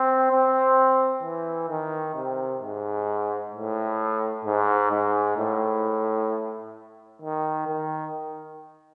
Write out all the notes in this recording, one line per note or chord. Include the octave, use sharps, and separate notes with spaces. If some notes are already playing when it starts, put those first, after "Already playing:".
Already playing: C4
C4
E3
D#3
C3
G#2
A2
G#2
G#2
A2
D#3
D#3